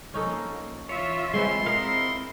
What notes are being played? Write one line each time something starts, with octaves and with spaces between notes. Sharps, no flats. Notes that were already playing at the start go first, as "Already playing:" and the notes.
F3 A#3 C#4 D#4 A4
E3 F4 C#5 E5
G#3 C4 B4 C6
C4 E4 A#4 D#5 F5